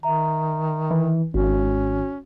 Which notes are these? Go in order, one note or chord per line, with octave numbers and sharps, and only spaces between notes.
D#3 E5 A#5
E3
G#1 C#4 F#4